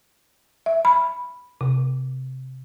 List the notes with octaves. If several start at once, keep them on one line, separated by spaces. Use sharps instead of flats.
E5
B5
C3